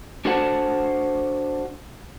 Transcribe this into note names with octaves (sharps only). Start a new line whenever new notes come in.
D4 F#4 A4 C5 F#5 A5